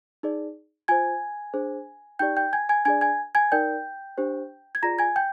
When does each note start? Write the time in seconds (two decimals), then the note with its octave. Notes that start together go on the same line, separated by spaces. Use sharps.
0.23 D#4 G#4 D5
0.88 F4 C5 G#5 G#6
1.54 D4 G#4 C5
2.19 D#4 G4 D5 G5 G6
2.37 G5 G6
2.53 G#5 G#6
2.69 G#5 G#6
2.85 D4 G#4 D5 G#5 G#6
3.01 G#5 G#6
3.35 G#5 G#6
3.52 D#4 A#4 D5 G5 G6
4.18 D4 G4 C5
4.75 G#6
4.83 F4 G#4 D5 A#5 A#6
4.99 G#5 G#6
5.16 G5 G6